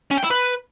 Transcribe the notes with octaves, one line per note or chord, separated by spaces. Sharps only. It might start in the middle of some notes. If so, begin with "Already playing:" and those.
C#4
G5
E4
B4